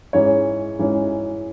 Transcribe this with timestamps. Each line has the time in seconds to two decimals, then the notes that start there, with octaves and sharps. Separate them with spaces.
0.13 G#2 E3 G#3 C#4 C#5
0.79 G#2 E3 G#3 C#4